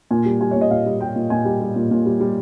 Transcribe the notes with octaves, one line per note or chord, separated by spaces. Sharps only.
A#2 G#5
G3
G3 G#5
A#2 C#5
D#5
A#2 F5
G3
G3 G5
A#2
A#2 G#5
G3
G3
A#2
A#2
G3
G3